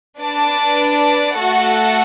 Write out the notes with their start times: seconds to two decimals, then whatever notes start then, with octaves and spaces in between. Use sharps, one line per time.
0.18 D4 B4 D5 A5
1.38 A3 F#4 A4 F#5 A5